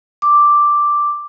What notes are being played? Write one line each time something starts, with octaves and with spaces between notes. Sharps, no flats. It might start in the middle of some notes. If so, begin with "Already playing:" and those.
D6